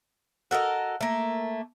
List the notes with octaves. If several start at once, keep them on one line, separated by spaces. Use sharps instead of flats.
F#4 A4 A#4 D#5
A3 A#3